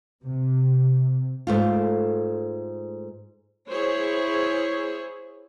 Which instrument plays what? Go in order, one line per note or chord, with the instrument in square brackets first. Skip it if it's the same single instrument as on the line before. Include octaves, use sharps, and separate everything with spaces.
[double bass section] C3
[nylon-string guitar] G#2 A3 F4
[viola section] E4 G#4 C5 C#5